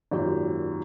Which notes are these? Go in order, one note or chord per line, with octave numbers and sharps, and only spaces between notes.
G#1 F#2 A#2 G4